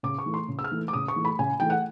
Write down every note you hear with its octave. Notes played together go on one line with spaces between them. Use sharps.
C#3 D6
C#6
E3 A3
C6
C#3
E6
F6
E3 A3
D6
C#3 D#6
C#6
E3 A3
B5
C#3 G#5
E3 A3 G5
F#5